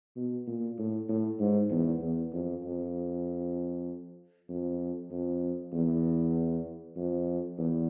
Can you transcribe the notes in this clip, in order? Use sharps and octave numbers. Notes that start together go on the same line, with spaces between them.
B2
A#2
A2
A2
G#2
E2
E2
F2
F2
F2
F2
E2
F2
E2